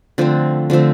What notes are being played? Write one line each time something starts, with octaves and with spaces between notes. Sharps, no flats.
D3 F3 A3 C4
D3 F3 A3 C4